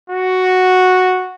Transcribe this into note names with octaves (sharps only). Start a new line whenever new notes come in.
F#4